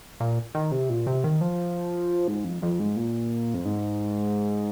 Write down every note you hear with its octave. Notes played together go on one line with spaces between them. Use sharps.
A#2
D#3
C3
A#2
C3
D#3
F3
G#2
F2
F2
G#2
A#2
F2
G#2